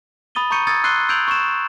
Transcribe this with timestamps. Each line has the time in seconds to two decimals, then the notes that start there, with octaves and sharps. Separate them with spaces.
0.35 B5 D#6 A6 D#7 G7
0.50 A#5 B5 C#6 G6 C#7 D#7
0.67 B5 D#6 E6 G#6 A6 C#7
0.84 C6 E6 F#6 C7 D#7 G7
1.09 E6 G6 G#6 D7 F7 F#7
1.28 C#6 E7